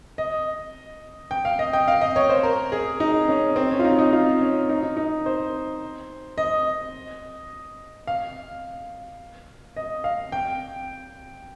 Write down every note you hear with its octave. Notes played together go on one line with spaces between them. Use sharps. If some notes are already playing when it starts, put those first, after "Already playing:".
D#5
G5
F5
D#5
G5
F5
D#5
C#5
C5
A#4
G#4
D#4
C#4
C4
C#4
F4
D#4
D#4
F4
C#4
D#4
D#4
D#4
C5
D#5
F5
D#5
F5
G5